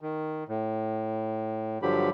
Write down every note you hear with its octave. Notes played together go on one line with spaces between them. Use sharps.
D#3
A2
G2 D3 F3 F#3 G4 B5